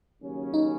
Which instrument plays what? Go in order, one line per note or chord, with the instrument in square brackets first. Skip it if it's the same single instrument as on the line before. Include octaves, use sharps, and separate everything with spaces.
[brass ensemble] D#2 C#3 F#3 C#4
[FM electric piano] D#4